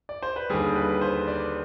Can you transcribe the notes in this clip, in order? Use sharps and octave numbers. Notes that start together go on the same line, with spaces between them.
D5
C5
B4
D#2 D3 G3 G#4
B4
C5
D5